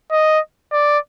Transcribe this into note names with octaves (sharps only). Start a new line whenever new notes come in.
D#5
D5